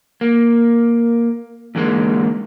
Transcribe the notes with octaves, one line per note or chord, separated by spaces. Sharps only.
A#3
E2 G#2 D3 G#3 A#3